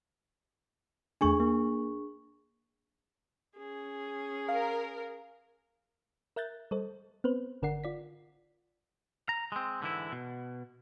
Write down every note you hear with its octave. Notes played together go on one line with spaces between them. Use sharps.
E2 A3 D4 G#4 G#5 C#6
A#3
C#4 G#4
A#4 F5
A#4 E5 F#6 G6 A6
G3 A4 C5 D#5
B3 C4 B4 C5
G1 D3 A#4 D5 F#5 C7
F4 D5 B6
A#5
G#3 C4
G#2 D3 E3 E4
B2